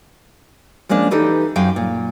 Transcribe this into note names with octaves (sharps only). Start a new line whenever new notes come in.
F3 G#3 A#3 C#4 D4
E3 D#4 G4 A4 B4
F#2 F5 G5 G#5
A#2